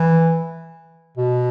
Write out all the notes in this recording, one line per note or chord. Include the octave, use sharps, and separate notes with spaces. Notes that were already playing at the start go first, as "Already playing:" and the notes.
Already playing: E3
B2